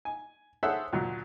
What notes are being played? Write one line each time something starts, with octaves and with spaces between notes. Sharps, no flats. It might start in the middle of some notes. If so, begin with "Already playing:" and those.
G#5
G#4 A4 C5 C#5 E5 F#5
D2 A#2 F#3